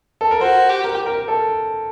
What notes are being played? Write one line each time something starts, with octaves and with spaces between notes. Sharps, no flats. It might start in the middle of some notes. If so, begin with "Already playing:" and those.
A4
A#4
F#4 C5
G4
A#4
A#4
A4